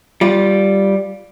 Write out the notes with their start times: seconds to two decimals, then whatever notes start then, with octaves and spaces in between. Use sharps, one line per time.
0.21 G3 F4